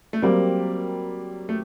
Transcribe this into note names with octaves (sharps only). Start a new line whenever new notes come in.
A3
F#3 G3 A#3 C4 G4 A#4
A3